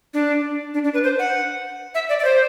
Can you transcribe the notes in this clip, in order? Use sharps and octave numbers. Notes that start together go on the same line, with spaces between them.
D4
D4
D4
B4
C5
F#5
E5
D5
D5
C5